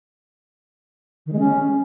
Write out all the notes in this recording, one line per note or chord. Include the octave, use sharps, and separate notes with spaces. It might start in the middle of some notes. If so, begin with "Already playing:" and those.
D#3
G#3
C#4